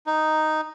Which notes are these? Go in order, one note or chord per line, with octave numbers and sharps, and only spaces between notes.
D#4